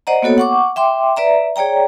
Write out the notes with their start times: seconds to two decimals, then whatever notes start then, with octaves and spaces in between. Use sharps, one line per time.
0.07 C5 D5 D#5 F#5 A#5
0.22 A#3 B3 F#4 A4 C#5
0.38 F#5 C#6 D6
0.76 E5 G5 C6 D6
1.17 B4 D5 E5 A#5
1.56 G#4 C#5 D5 G5 A#5